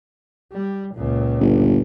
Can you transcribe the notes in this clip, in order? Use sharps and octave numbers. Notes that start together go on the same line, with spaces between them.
G3
C#2 A#2
G1